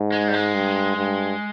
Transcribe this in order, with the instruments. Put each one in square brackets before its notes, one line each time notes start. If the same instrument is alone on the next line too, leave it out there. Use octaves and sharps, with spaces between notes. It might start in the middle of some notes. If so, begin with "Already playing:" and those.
Already playing: [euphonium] G#2
[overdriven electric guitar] G#3
G3
G#3
[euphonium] G2
G2